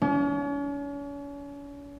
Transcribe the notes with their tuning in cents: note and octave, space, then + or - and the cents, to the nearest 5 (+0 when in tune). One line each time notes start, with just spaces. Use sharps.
C#4 +40